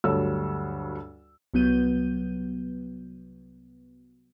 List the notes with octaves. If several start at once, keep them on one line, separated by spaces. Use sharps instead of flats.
D2 G2 F#3 A4 C#5 E6
C2 F#3 B3 G6 D#7